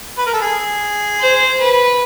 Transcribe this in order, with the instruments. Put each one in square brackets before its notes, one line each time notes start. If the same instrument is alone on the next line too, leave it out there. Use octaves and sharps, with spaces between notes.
[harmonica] B4
A#4
A4
G#4
[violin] C5
B4